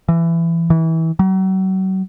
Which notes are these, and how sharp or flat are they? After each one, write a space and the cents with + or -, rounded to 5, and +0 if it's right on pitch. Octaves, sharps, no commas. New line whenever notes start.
E3 +20
E3 -25
F#3 +40